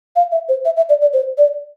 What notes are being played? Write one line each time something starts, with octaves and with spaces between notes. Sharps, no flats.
F5
E5
C5
E5
E5
D5
D5
C5
D5